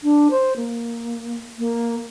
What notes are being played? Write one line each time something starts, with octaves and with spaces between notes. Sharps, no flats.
D4
C5
A#3
A#3